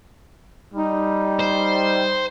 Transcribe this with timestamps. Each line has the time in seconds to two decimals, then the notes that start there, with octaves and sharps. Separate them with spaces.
0.74 G3 D#4
1.39 C5